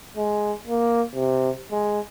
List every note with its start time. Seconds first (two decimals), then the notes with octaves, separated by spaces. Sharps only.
0.17 G#3
0.67 A#3
1.15 C3
1.72 G#3